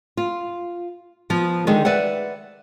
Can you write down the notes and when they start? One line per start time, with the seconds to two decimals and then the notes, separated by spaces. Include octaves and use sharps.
0.17 F4
1.30 F3 B3
1.67 D3 D#3 G#3 D#4 G#4
1.85 B4 D5 E5 F#5